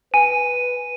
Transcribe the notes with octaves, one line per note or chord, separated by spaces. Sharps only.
B4 G#5 D#7